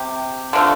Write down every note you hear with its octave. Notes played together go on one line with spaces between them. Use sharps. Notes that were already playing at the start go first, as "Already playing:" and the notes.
Already playing: C3 G4
D3 F3 A3